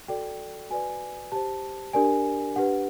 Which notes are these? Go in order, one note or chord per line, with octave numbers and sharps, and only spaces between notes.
F#4 A4 D5 G5
F#4 B4 D5 G#5
G4 C5 A5
D4 G4 A#4 D5 G#5
D4 G4 B4 F#5